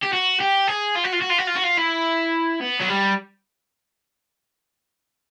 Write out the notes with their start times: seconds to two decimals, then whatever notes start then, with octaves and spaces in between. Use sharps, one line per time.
0.03 G4
0.13 F#4
0.40 G4
0.67 G#4
0.95 F4
1.04 F#4
1.12 F4
1.21 F#4
1.29 F4
1.38 F#4
1.47 F4
1.56 F#4
1.64 F4
1.78 E4
2.61 B3
2.80 F#3
2.88 G3